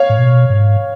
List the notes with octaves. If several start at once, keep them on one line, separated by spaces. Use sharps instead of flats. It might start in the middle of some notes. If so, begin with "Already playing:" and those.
Already playing: C#5 F5
A2
B2
G#2